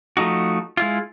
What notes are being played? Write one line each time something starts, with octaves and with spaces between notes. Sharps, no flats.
F3 A3 D#4 F#4
G#3 E4 F4